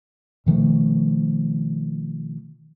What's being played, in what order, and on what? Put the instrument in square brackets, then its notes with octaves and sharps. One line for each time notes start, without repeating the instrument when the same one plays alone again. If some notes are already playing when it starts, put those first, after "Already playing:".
[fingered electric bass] B2 D#3 F3 A3